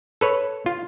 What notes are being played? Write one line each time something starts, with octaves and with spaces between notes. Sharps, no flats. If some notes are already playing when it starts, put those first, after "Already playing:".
A4 B4 C#5
F4